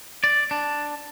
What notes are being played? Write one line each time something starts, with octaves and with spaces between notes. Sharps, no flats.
D5
D4